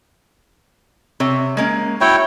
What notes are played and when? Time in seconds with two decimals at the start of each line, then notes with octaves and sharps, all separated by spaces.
1.20 C3 C#5
1.57 G#3 A#3 C#4
2.01 E4 F#4 C#5 G5